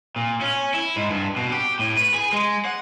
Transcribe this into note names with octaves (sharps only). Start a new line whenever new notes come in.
A#2
C#4
E4
G#2
G2
B2
G4
A2
B4
G#4
G#3
F#5